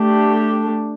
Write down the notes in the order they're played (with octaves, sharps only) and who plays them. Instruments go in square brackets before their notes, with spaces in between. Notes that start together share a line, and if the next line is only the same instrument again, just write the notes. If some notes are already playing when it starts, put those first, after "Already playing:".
Already playing: [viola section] A3 D4 G4